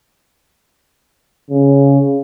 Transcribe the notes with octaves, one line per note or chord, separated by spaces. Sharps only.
C#3